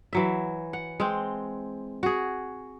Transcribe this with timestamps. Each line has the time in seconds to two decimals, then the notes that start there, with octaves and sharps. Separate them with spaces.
0.13 E3 F#3 E5
0.73 F#5
1.00 G#3 C4
2.03 F#4 G#4